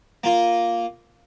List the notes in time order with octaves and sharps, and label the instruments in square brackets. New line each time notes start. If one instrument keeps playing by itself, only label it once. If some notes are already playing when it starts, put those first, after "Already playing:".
[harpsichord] A#3 F4